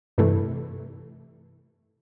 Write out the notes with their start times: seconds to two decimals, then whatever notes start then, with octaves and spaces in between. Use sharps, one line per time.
0.18 G2 C3 E3 A3